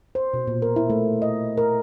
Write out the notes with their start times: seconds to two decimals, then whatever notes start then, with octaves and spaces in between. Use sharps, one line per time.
0.15 C5
0.34 B2
0.47 A#2
0.62 A#4
0.76 E4
0.90 A3
1.22 D#5
1.57 A#4